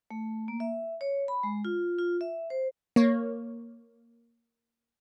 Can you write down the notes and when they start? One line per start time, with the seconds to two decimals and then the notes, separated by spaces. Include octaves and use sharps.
0.11 A3
0.48 A#3
0.60 E5
1.01 C#5
1.28 B5
1.43 G#3
1.65 F4
1.99 F4
2.21 E5
2.50 C5
2.96 A#3 C#5